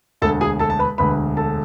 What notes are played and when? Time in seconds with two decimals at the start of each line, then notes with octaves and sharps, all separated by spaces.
0.22 E1 D2 D3 A4 A5
0.41 G#4 G#5
0.59 A4 A5
0.70 A5
0.79 B4 B5
0.98 E1 D2 D3 B4 B5
1.37 A4 A5